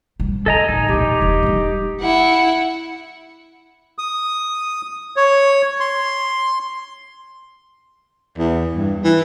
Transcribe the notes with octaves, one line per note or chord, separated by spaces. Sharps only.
G#2 G3
D3 A4 D#5 G#5 A#5
A1 D#4
A#1 E2 G4
E1 E3
G3 D4
E4 F#5
D#6
C#5
C6
E2
G2
E3